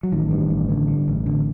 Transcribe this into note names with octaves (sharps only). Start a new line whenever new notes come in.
F#3
A1 D#3
G2
A1
D3
G2
A1
D3